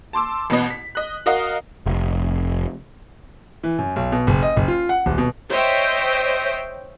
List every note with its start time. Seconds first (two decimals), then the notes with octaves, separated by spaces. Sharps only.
0.13 A5 C6 D6 E6
0.50 A1 B2 B3 D#5
0.70 B6
0.95 D#5 F#6
1.26 F#4 A#4 D#5 F5 F#5
1.86 F1
3.63 E3
3.78 F#2
3.96 B1
4.12 B2
4.27 F#1
4.42 D#5
4.56 F#1
4.68 F4
4.89 F#5
5.06 D#1
5.18 B2
5.49 C5 C#5 D#5 E5 G5